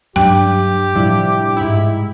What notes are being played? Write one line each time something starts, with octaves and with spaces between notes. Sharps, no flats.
G2 F#3 C#4 D4 G4 G5
A2 C3 F3 G3 D4 E4
G#2 E4